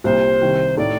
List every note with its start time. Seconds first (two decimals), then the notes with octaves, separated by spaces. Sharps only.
0.04 C2 A#2 G3 C5
0.42 C2 C3 D#3
0.77 A2 A3 D#4 D5